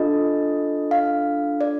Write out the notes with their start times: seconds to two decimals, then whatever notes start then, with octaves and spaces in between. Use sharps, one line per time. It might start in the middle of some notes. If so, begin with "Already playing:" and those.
Already playing: D4 F4 A4 D#5
0.91 F5
1.61 D5